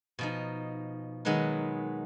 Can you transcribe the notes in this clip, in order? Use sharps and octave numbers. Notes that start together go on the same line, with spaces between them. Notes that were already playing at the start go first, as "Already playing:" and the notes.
B2 F3 D#4
D#3 F#3 G#3 B3 D#4 B4